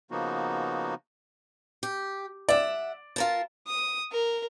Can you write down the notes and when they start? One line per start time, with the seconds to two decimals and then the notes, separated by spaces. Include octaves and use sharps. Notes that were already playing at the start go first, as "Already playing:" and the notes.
0.11 C#3 F3 A#3 B3 D#4 F#4
1.83 G4
2.48 D5 E5 F#5
3.16 F4 A#4 A5
3.67 D#6
4.12 A#4